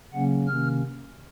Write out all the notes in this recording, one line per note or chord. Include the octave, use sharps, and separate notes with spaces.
C#3 F#3 A#3 C#4 F#5
C3 D#3 A#3 C#4 F6